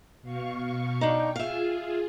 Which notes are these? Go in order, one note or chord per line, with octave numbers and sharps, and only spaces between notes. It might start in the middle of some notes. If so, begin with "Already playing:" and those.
B2 F5 C#6
D4 D#4 G5
F4 G#4 E5 F5